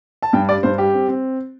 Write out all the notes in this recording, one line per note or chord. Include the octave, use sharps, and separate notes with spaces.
A5
G2 G5
G3 D5
G2 C5
G3 G4
C4
C4